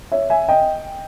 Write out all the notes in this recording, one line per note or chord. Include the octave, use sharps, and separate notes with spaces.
C#5 E5
E5 G#5
D#5 G5